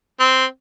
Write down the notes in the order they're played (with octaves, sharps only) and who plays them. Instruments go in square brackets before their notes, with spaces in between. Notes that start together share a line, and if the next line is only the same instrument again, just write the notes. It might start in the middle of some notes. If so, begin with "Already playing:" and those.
[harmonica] C4